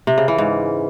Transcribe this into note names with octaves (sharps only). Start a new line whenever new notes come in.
C3
C#3
E3
G#2